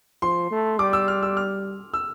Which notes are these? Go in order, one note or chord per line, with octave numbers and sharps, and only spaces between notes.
F3 C6
A3
G3 D6
E6
F6
E6
F6
E6